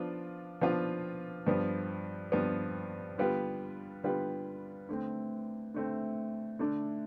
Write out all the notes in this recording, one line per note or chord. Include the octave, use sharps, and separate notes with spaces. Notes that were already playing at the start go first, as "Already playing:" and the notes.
Already playing: F3 B3 D4 F4
F3 B3 D4 F4
G2 F3 B3
G2 F3 B3
D3 G3 B3 F4 B4
D3 G3 B3 F4 B4
D3 A3 C4
D3 A3 C4
D3 A3 D4